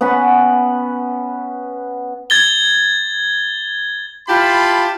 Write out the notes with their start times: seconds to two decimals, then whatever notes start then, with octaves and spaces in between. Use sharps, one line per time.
0.01 B3 C#4 F#5 B5
2.30 G#6 A6 G7
4.28 E4 F4 G4 A5 B5